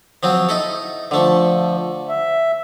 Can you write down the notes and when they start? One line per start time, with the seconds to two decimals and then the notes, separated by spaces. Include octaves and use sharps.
0.23 F3 F#3 C4
0.49 D#4 E4 A4
1.11 D3 F3 A3
2.09 E5